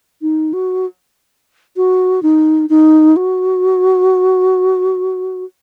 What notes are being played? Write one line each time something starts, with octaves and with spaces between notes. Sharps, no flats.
D#4
F#4
F#4
D#4
D#4
F#4